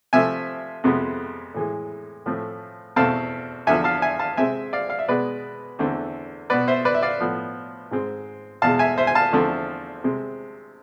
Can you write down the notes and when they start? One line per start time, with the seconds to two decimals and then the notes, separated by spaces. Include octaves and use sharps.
0.13 C3 F3 A3 C4 E5 G#5
0.84 F2 C3 G#3 B3
1.54 A2 E3 G#3
2.26 A2 F3 A3 C4
2.96 E2 B2 A3 C4 F5 A5
3.67 E2 D3 F3 E5 G#5
3.84 F5 A5
4.02 E5 G#5
4.19 F5 A5
4.37 C3 G#3 C4 E5 G#5
4.73 D5 F5
4.90 F5
4.99 E5
5.08 B2 G#3 B3 B4 D5
5.79 E2 D3 A3 C4
6.50 B2 B3 B4 D5
6.68 C5 E5
6.85 B4 D5
6.95 E5
7.03 D5 F5
7.20 A2 F3 B3
7.91 G#2 G#3 C4
8.62 E2 B2 G#3 F5 A5
8.79 E5 G#5
8.98 C5 E5
9.07 G#5
9.15 F5 A5
9.33 E2 D3 F3 A3 C4
10.04 C3 G#3 C4